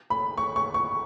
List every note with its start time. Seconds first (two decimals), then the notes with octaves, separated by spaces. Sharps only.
0.10 B5
0.37 C#6
0.56 C#6
0.74 C#6